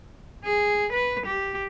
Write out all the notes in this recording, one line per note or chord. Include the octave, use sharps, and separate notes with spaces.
G#4
B4
G4